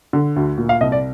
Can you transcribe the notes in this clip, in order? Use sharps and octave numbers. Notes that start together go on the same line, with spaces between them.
D3
D2
A#2
F5
C2 D#5
D5